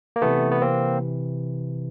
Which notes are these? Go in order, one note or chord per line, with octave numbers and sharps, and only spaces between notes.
A#3
C3 E3 A3 B3
B3
A#3 C4